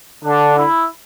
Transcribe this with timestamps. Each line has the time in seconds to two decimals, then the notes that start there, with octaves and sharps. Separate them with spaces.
0.24 D3 D4
0.58 E4